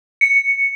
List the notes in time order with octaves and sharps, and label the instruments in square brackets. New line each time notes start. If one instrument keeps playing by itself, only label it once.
[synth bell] C#7